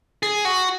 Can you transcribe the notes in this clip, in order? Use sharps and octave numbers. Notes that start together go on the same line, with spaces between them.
G#4
F#4